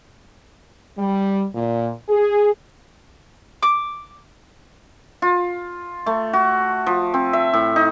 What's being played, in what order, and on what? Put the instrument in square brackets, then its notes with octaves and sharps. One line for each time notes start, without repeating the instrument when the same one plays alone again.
[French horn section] G3
A#2
G#4
[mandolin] D6
[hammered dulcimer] F4
A3
F#4
F3
C4
E5
A2
D#4